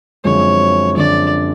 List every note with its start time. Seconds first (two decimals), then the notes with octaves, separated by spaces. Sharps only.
0.24 F#2 D3 F3 G#3 C4 C#5
0.97 F#2 D3 F3 G#3 C4 D5